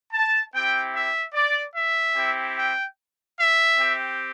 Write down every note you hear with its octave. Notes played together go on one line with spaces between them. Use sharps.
A5
C4 E4 G4 G5
E5
D5
E5
C4 E4 G4
G5
E5
C4 G4